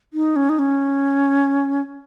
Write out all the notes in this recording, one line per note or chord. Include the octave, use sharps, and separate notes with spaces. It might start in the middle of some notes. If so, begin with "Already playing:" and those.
D#4
C#4
D#4
C#4